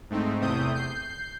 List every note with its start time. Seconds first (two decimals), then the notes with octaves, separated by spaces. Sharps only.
0.10 G#2 A3 C4 D#4
0.40 E2 C3 A3 C4 D#6 G6
0.75 G6 C7